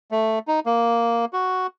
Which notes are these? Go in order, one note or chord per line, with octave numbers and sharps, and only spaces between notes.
A3
D#4
A#3
F#4